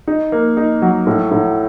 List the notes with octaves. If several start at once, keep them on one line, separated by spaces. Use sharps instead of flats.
D#4
A#3
D#4
F#3
A2
A2